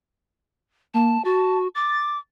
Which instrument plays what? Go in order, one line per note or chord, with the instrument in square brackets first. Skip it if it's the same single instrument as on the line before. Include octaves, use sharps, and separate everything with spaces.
[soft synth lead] A#3 [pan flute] A5
[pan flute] F#4 [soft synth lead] A5
[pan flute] D6 [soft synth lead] A6